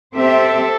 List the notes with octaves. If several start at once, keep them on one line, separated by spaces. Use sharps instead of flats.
C4 G4 A4 C5 E5